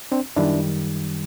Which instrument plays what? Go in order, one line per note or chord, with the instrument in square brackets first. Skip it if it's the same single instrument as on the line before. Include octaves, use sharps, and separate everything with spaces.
[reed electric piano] C4 D4
F#2 D#3 G3 D4 E4